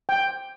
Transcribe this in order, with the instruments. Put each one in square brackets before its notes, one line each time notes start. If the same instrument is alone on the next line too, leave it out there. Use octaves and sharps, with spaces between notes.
[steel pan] G5